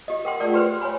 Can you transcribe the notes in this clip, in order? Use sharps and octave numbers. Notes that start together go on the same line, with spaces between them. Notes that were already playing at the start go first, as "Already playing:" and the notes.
G4 D#5
A#4 F#5 G5 C6
A3 F4 G#4 A#4 D5
G4 B4 C5 C6
C#5 G#5 B5